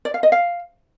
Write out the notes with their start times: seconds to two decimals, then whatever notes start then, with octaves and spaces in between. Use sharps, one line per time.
0.05 D5
0.14 F5
0.23 D#5
0.32 F5